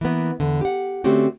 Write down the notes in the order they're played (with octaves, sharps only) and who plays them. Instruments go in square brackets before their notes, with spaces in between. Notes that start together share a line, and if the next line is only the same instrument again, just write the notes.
[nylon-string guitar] E3 A#3 B3
E2 D3
G4 F#5
D3 A3 C4 C#4 F#4 G4